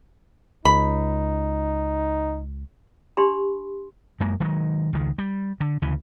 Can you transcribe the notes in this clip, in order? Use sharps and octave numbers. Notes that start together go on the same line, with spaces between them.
C#2 D#4 B5
D4 G4 B5 C6
F#2 G#3 A#3
D#3 F#3 G#3
C#2 D#3
G3
D3
D2 C#3 E3